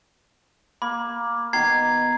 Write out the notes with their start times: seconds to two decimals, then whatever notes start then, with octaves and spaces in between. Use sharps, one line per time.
0.82 A#3 B5
1.53 B2 D#3 A#5 G#6 C7